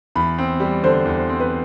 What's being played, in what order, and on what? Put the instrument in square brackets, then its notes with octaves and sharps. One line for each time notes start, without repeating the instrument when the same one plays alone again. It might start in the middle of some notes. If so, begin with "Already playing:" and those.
[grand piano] E2 [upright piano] B5
[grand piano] C4
G3
[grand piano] D3 [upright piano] C5
[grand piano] E2
C4
[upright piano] B4